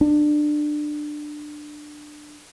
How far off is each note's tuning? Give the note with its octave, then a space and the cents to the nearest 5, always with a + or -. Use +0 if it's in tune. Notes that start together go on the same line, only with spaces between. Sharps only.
D4 +20